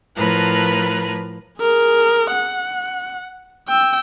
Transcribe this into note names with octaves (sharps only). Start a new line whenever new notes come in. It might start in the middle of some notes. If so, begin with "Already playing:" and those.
A2 F3 A#4 B4 A#5 F#6
G#4 A#4
F#5
G5 E6